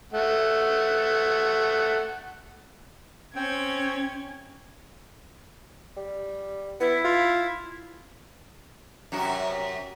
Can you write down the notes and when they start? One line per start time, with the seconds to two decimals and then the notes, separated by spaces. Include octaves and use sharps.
0.13 A3 F#5
3.35 C4 C#4 G5 G#6
5.97 G3
6.80 B3 E4
7.05 F4
9.12 F#2 C3 F#4